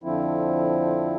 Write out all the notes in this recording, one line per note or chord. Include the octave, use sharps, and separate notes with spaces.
F2 D3 F3 C4 E4